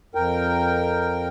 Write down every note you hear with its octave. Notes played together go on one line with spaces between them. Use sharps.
F2 A#4 G5